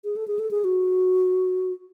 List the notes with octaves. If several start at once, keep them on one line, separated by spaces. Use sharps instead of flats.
G#4
A4
G#4
A4
G#4
F#4